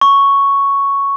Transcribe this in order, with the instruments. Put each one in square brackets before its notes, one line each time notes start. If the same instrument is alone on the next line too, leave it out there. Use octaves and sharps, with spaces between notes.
[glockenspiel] C#6